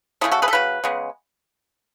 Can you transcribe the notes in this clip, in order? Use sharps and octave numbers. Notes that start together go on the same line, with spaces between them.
C#3 F#3 A3 E4 G#4
F#4 A4
G#4 B4
A4
C#3 F#3 B4
C#3 G#3 B3